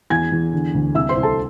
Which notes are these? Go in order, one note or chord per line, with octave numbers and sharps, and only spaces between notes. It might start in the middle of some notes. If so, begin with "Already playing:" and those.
E2 G#5 G#6
E2
D3
D2
C2 E5 E6
C5 C6
C2
A4 A5